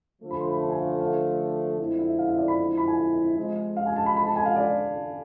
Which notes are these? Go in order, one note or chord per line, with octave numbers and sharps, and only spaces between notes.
D3 F3 A3
B5
C6
B5
A5
G#5
F5
E5
F5
F2 D3 G#3 C4 E4
E5
F5
E5
D5
B5
B5
G#5
C3 F3 G#3
F5
G#5
A5
B5
B5
A5
G#5
F5
D5